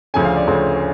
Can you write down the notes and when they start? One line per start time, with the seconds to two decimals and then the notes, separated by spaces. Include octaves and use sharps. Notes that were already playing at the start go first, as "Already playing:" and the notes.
0.14 D2 C#3 F3 A3 C#4 G#5
0.25 F5
0.36 D5
0.47 D2 C#3 F3 A3 C#4